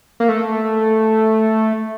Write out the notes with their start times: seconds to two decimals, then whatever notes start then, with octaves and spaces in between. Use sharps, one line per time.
0.20 A#3
0.29 A3